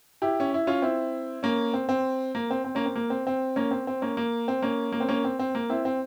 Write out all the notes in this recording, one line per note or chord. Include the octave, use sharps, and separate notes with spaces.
E4 G4
C#4
E4
C#4 F4
C4 E4
A#3 C#4
C4
C4
A#3
C4
C4
A#3 C#4
C4
A#3
C4
C4
A#3 C#4
C4
C4
A#3 C#4
A#3
C4
A#3 C#4
A#3
C4
A#3 C#4
C4
C4
A#3
C4 E4
C4